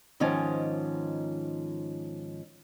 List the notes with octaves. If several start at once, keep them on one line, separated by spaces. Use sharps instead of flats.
G#2 D#3 F3 C#4